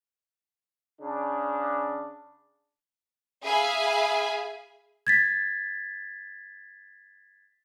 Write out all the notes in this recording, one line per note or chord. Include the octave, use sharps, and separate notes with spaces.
C#3 D4
G#4 E5 F5 G#5 B5
G#6 A6 B6